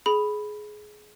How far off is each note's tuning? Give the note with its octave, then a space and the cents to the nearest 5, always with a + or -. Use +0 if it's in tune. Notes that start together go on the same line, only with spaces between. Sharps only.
G#4 +20 B5 +0